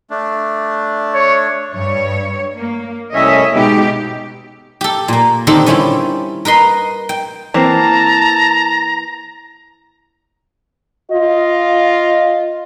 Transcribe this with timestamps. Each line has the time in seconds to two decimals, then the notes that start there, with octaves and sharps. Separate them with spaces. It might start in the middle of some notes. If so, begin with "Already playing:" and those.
0.10 A3 D4
1.14 C#5
1.74 G2 C#5
2.54 A#3
3.14 C2 A2 C#4 D#5 E5
3.54 B2 G#3 D#4 G4 B4
4.81 G4 A4
5.08 A#2 A#3
5.47 D3 D#3 C4 G4 A4 D5
5.66 G3 C#4 E4 F4 G4
6.45 A#4 B4 D#5 C6
7.09 G5
7.54 E3 A#3 C4 A5 A#5
11.11 F4 D#5